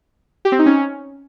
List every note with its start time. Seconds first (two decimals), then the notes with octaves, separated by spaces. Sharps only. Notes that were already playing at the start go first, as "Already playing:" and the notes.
0.45 G4
0.52 C4
0.59 D#4
0.66 C#4